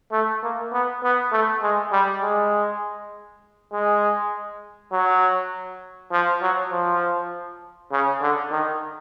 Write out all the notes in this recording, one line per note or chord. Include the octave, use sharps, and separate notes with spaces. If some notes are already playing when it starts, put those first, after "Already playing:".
A3
A#3
B3
B3
A3
G#3
G3
G#3
G#3
F#3
F3
F#3
F3
C#3
D3
D#3